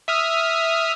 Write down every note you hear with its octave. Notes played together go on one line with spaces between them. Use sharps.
E5 D#6 F6